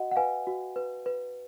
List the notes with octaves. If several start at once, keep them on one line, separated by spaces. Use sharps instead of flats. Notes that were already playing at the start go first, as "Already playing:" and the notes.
Already playing: F#4 D#5 F#5
F#5
B4 F5 G#5
F#4
B4
B4